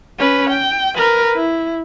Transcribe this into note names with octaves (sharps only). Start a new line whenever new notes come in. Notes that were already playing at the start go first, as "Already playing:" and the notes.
C#4 B4
G5
A#4 B4
E4